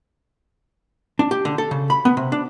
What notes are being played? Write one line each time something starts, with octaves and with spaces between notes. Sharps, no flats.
D4
G4
D3
A4
C#3
B5
B3
C3
D4